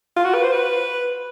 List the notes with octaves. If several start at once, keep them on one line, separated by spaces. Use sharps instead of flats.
F4
F#4
B4
C5
B4